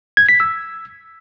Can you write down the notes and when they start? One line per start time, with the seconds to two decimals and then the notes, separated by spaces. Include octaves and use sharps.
0.17 G#6
0.29 B6
0.40 E6